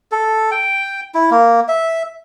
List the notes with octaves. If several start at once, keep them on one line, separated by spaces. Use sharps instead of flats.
A4
G5
E4
A#3
E5